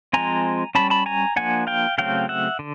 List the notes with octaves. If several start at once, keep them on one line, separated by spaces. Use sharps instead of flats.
F3 G#3 C4 G#5 A#5
G3 A#3 C#4 A5 B5
A5 B5
G#5 A#5
F3 A#3 D4 F#5 G#5
F5 G5
C#3 F#3 A3 C4 F5 G5
E5 F#5
D3